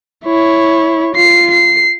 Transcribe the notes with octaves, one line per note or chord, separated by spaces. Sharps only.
E4 C#5
F4 C7
C7